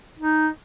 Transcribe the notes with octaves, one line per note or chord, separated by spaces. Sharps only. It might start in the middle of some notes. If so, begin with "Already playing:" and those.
D#4